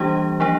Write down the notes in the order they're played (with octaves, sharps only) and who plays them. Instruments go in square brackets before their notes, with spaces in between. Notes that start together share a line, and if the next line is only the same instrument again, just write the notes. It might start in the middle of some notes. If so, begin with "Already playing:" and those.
Already playing: [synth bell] E3 G3 A#3 D4 G4
F3 A#3 D4